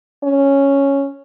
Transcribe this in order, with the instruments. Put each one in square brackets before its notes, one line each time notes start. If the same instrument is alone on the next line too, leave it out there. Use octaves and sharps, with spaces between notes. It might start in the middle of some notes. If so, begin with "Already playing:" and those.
[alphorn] C#4